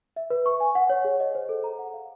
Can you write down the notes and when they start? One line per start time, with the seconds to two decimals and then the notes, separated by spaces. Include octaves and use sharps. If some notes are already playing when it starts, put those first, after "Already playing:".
0.16 E5
0.30 B4
0.46 C#6
0.60 G#5
0.75 F#5
0.90 C#5
1.05 G#4
1.20 D#5
1.35 C5
1.49 A4
1.64 A#5
1.79 F#5
1.94 F5